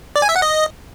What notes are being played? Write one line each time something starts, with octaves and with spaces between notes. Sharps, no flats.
D5
G#5
E5
F#5
D#5